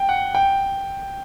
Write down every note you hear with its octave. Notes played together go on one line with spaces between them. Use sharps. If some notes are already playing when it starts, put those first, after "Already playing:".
Already playing: G5
F#5
G5